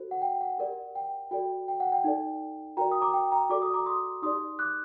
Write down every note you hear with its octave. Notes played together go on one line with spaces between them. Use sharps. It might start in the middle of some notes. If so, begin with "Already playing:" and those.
Already playing: F#4 A4 C5
F#5
G5
F#5
G4 A#4 D5
G5
F#4 A4 D5 G5
G5
F#5
G5
D#4 A4 D5
F#4 A#4 D5 G5 A#5
D#6
A#5 D6
G5
G5 A#5
F#4 A4 D5 D6
D#6
A#5 D6
C6 D#6
D#4 G4 D5 C6 D#6
D6 F#6